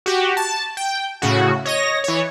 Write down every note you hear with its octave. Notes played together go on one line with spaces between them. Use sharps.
F#4 G4
A5
G5
A2 C#3 F#4
C#5 D#5 A#6
E3 C#5